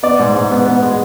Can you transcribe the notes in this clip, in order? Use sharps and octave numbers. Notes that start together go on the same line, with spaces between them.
B3 D5
G#2
G#2
B3
B3
G#3